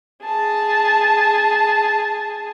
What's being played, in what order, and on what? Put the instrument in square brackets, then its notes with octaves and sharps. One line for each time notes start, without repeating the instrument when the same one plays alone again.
[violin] G#4 A5